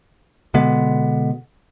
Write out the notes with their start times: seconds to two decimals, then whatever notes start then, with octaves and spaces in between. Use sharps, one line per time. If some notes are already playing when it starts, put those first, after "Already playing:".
0.54 B2 D3 G#3 B3